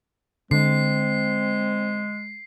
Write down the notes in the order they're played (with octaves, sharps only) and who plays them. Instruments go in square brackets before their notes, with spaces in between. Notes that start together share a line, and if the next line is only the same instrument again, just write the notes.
[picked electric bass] D3 [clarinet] G#3 [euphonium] C4 [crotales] C7